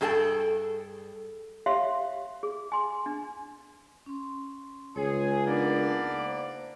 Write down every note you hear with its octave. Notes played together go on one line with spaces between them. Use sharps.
G2 G#4 A4 G5 A5
G4 C#5 E5 F5 C6
G#4
G#5 C6
D4
C#4 C6
C#2 G#4 C#5
A#3 B3 D4 D#4 A#4 D5
A5
C5